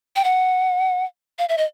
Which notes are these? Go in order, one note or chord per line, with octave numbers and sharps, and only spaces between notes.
G5
F#5
F5
E5
D#5